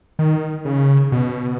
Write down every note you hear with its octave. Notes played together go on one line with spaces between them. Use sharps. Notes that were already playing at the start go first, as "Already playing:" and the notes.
D#3
C#3
B2